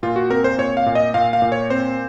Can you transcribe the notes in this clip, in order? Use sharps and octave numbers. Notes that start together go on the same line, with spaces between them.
A#2 F4
F#4
C4 A#4
C5
A#2 C#5
F5
A#2
D#5
A#2 F5
F5
A#2
C#5
C4 C5